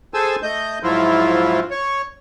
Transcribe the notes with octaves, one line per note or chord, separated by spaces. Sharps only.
G#4 A4 C5 G#5 A5 E6
A3 D#5 G6
G#2 F3 F#3 E4 F4
C#5